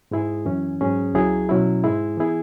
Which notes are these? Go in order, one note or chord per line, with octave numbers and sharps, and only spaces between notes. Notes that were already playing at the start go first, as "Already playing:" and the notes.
G#2 G#3 E4 G#4
F#2 E3 C#4
G#2 F#3 C#4 G#4
C#2 C#3 F#3 E4 G#4
B2 F#3 C#4 E4
G#2 G#3 E4 G#4
E3 B3 E4 G#4